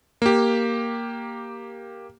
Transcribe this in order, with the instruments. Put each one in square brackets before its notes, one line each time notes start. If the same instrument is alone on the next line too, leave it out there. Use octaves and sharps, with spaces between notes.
[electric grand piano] A#3 G4